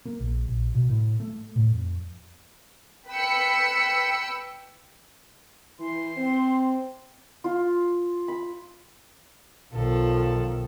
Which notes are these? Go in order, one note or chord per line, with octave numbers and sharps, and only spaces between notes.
A#3
A#1
A#1
B2
A2
A3
A2
F2
B4 G5 B5 E6 C#7
E3 C6
C4
F4
B5
B1 D#3 F3 F4 A4